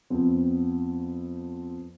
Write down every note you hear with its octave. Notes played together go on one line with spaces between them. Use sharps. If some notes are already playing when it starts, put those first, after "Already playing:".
F2 B3 C4